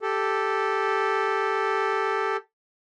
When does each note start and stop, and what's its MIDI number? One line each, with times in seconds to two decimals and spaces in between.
0.01 2.37 67
0.01 2.37 69